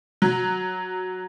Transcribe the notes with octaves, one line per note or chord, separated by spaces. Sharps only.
F#3